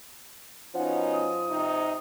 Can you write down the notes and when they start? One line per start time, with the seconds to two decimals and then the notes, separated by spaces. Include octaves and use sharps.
0.74 B2 F3 C#4 D#4 F#5
1.13 D#6
1.49 C3 D#4